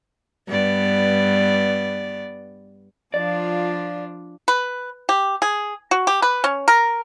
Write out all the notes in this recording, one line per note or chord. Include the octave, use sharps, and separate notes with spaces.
G2 B3 D5
F3 D4 F4 D5
B4
G4
G#4
F#4
G4
B4
C#4
A#4